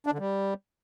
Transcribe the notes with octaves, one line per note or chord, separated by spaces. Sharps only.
D4
D3
G3